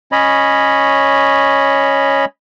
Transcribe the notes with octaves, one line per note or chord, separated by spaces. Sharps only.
C#4 C#5 D#5 B5